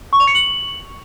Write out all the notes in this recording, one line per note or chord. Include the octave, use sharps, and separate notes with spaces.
C#6
F7
C#7
F#7